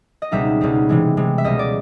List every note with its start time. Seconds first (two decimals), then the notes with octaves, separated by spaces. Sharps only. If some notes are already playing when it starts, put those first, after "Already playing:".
0.22 D#5
0.31 C#2 B2 G3 C4 D#4 E5
0.61 C#2 B2 G3 C4 D#4
0.89 C3 E3 G#3
1.17 C3 E3 G#3
1.38 E5
1.44 C#2 B2 G3 D#5
1.59 D5